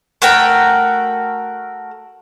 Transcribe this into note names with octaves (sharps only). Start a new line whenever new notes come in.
A3 F#4 A#4 G5